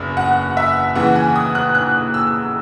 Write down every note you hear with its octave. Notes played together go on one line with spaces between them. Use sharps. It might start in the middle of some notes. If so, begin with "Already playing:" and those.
Already playing: F#1 E2 B2
F#5
E5
D#2 C#3 E3 F#5
G#5
D#6
F#6
F#6
E6